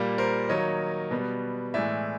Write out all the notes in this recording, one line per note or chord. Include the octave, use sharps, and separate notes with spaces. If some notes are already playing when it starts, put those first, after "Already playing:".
Already playing: A#2 G3 A#3
A#4 C5
D#3 F#3 A#3 C#5 D#5
B2 G3 B3
A2 E3 G#3 D5 E5